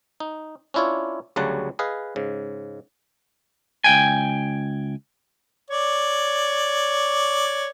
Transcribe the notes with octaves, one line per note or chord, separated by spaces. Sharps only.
D#4
C#4 D4 E4 F4 C#5
D2 C#3 F#3 G3 F#5 A5
G#4 B4 D#5 F5
G#2 C#3
C#2 G5 G#5
C#5 D5